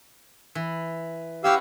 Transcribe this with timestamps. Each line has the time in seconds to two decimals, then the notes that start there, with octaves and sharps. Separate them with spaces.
0.55 E3
1.44 C#4 E4 F#4 G4 F5 E6